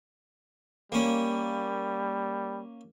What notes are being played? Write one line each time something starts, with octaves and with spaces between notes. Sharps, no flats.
G3 A#3 C#4